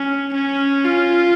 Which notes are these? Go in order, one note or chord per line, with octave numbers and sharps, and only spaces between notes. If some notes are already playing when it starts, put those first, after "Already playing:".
Already playing: C#4
C#4
F4